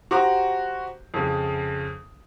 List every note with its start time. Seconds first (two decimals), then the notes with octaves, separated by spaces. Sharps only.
0.11 F#4 G4 C5 A#5 D6
1.14 F2 C#3